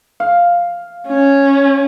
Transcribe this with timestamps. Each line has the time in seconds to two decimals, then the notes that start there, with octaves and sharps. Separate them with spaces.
0.20 F5
1.07 C#4